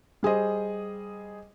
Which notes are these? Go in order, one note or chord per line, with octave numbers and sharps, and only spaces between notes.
G3 G#4 C5 D#5